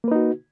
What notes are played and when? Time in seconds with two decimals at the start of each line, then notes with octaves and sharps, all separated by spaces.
0.04 A#3
0.08 B4
0.12 D#4
0.15 F#4